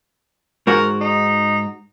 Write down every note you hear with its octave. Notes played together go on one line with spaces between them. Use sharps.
G#2 F#4 A#4
D#4